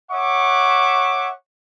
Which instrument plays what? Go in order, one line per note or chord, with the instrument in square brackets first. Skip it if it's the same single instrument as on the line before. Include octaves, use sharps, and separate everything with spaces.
[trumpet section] C#5 E5 F#5 C#6 D6